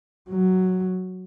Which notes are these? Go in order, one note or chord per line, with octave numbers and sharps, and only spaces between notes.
F#3